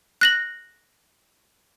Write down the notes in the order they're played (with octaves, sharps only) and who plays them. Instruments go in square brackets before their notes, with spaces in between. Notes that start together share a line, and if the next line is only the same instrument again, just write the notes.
[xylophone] F#6 A#6 F#7